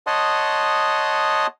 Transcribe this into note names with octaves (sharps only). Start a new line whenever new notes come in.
C#5 D#5 F#5 A5 C6 D#6